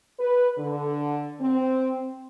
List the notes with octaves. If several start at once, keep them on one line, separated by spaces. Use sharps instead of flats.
B4
D3
C4